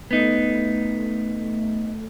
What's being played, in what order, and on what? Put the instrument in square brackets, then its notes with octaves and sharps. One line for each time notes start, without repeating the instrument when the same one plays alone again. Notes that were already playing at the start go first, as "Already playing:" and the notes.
[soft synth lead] A3 [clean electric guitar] B3 D#4